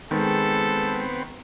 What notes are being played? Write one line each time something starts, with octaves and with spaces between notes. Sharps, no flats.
D#3 G#3 B3 C4 A4